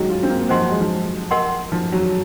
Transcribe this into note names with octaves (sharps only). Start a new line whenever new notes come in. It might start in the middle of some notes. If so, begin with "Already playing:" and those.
Already playing: D#3 F#3 G#3 F#4
F4
C4
A#3
F3 C5 D#5 F#5 C6
F#3
G#3
F3
A#4 D#5 F#5 C6
F3
F#3